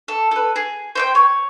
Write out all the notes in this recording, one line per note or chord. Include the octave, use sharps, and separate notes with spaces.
A4
A4 B4
G#4
C5 E5 G5
C#5